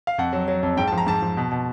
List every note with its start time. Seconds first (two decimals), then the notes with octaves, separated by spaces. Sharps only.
0.07 F5
0.18 F2 F#5
0.33 F#3
0.48 F#3
0.63 F2
0.77 G#2 G5
0.88 A5
0.92 F3
0.98 A#5
1.07 G#2 A5
1.22 F3
1.37 B2
1.52 B2